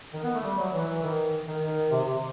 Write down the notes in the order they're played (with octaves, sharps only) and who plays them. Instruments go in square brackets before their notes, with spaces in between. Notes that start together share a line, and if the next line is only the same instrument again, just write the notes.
[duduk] D#3
B3
A3
G3
F#3
E3
E3
D#3
D#3
D#3
C3
C3